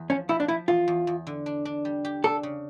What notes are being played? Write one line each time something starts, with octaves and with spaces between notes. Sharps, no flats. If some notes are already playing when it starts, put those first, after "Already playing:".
Already playing: E2
F3 C#4
F3 E4
D4
F3 E4
E2 F4
E2
E2
D3
D4
D4
G3
G4
D4 A4
C#3